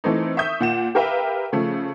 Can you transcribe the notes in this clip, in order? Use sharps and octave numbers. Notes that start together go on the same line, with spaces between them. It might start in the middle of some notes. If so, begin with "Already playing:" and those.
E3 A3 C4 D#4
E5 C#6 D#6 G6
A#2 F#5 E7
G4 A#4 B4 E5 F5 G5
C#3 F3 A3